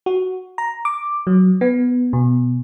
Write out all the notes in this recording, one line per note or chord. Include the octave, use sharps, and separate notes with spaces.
F#4
A#5
D6
F#3
B3
B2